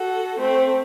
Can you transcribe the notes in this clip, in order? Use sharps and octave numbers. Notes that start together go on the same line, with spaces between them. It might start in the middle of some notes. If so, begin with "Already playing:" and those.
Already playing: F#4 A4
A3 C4